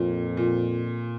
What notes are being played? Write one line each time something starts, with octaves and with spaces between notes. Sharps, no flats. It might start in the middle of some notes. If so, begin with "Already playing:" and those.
Already playing: F2 A#2
A#2